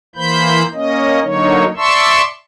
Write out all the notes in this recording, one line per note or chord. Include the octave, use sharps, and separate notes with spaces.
E3 A#3 C5 B5 G6
A#3 C#4 D#5
D3 F#3 A#3 D#4 C#5
D5 E5 A5 C6 C#6 E6